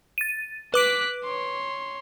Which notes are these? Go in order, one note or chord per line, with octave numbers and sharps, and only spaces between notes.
A6 D#7
B4 D6 F#6 B6 D7
C#5 C6